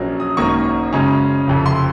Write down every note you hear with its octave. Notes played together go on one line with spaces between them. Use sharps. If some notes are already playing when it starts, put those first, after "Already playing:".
Already playing: A#1 A#2 F#3 A#3 C#4
D#6
G#1 F#2 D#3 A#3 C#6
F#2 C#3 G#3 C#4
F#1 F2 C3
C6